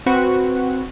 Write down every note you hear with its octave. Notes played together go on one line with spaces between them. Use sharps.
C4 F#4 B4